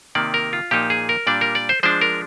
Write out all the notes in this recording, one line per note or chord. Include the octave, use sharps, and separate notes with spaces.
C3 D#3 A#3 D5
A#4
F4
A#2 F3 A#3 D#4 G4
G#4
A#4
A#2 G3 D4 D5
A#4
D5
C5
F3 G#3 D4 C5
A#4